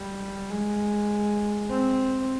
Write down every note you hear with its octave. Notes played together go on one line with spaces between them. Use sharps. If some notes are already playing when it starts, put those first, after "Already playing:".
Already playing: G3
G#3
C4